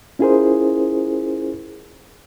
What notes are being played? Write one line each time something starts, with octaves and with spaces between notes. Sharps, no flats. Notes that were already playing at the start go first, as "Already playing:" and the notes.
C#4 E4 F4 G#4 A#4 C5